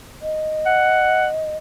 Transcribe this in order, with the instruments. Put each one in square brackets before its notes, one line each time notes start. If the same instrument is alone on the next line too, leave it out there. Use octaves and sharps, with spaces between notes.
[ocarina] D#5
[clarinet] F#5